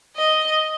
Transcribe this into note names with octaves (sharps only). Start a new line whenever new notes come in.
D#5